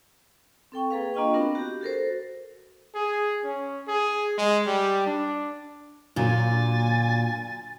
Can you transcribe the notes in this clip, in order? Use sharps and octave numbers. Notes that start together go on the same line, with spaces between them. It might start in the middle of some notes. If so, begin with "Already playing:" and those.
C4 A4 G5 C#6
A#3 G#4 B4 F5
A#3 D4 F4 D#5 G5 C#6
B3 C4 D4 F#4 A#4
F#4 G4
F#4 A4 A#4 C5
G#4
C#4
G#4
G#3
G3
D4
A#2 D3 F#3 A#3 G#5 A6